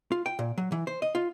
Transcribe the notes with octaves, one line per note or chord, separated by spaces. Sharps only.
F4
G5
A#2
F#3
E3
C5
D#5
F4